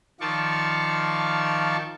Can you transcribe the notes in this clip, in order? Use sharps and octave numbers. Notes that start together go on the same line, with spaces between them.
D#3 F3 F4 D5 A5 C#6